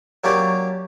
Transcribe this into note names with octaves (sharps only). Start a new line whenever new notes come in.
F#3 A#3 C#4 D4 G4 D5